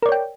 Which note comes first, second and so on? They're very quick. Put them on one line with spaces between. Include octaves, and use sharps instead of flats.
A#4 D5 C#5 G5